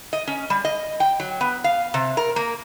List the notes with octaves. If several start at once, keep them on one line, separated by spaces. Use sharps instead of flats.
D#5
C#4
G3
D#5
G5
F#3
B3
F5
C3
A#4
A#3